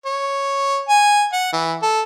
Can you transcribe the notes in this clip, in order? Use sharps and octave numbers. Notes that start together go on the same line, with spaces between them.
C#5
G#5
F#5
E3
A4